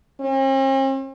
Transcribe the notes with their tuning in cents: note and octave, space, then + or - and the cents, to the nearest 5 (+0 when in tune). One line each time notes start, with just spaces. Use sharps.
C4 +45